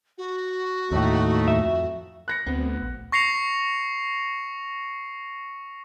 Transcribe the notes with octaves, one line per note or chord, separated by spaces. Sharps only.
F#4
D#2 A2 A3 D#4
F2 E5
F#6 A#6 C#7
D2 B3 C4
A#1
C#6 A#6 C7 C#7 F7